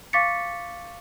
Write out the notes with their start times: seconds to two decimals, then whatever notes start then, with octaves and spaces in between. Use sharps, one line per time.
0.13 F5 C#6 D6 A6 B6 C#7